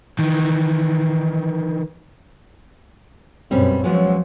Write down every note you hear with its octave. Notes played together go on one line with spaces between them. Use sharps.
D#3 E3
F#2 B2 G3 C4 C#4
F3 F#3 G#3 B3 C#4